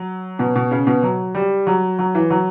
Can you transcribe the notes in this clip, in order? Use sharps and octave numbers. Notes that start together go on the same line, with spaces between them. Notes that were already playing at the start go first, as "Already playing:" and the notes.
Already playing: F#3
B2
B2
C#3
B2
F#3
G3
F#3
F#3
E3
F#3